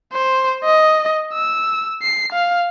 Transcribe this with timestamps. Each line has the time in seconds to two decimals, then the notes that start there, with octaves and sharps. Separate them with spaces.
0.13 C5
0.64 D#5
1.33 E6
2.02 C7
2.33 F5